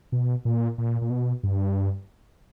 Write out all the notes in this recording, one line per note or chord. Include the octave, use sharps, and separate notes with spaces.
B2
A#2
A#2
A#2
B2
G2